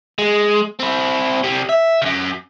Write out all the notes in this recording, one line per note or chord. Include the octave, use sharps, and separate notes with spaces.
G#3
C4 E4
C3 G3
E5
F#2 C#3